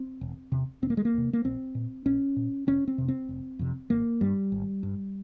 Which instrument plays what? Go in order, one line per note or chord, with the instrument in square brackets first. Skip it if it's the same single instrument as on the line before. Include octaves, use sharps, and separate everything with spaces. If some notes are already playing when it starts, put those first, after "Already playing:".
Already playing: [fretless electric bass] C4
E1
E2 C3
E1 C4
A#3
G#3
A#3
E2 C3
A#3
A#1 C4
A#2
A#1 C#4
A#2
F1 C#4
C4
F2 C3
C4
F1
F2 C3
G#1 A#3
G2 G3
G#1
G2